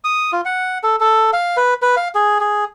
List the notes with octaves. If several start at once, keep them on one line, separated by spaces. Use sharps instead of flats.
D#6
F4
F#5
A4
A4
F5
B4
B4
F5
G#4
G#4